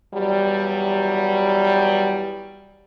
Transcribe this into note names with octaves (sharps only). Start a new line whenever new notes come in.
E2 F#3 G3